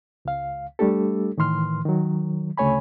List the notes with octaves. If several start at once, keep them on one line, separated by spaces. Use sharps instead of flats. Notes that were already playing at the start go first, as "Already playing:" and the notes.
C#2 F5
G3 A3 D4 G4 A4
A2 D#3 E3 C6 F6
D#3 F#3
D2 C#3 A3 C#5 G#5 B5